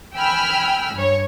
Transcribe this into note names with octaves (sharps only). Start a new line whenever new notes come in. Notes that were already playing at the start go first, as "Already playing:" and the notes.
G5 G#5 B5 E6 F6
G2 C#5